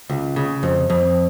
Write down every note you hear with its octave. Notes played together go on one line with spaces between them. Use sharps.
C#2
C#3
F2
F2